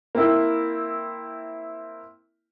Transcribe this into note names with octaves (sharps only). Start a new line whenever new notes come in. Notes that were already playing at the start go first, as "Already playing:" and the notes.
A#3 C4 E4